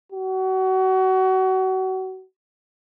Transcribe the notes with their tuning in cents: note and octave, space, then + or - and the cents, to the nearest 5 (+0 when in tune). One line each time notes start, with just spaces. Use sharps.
F#4 +30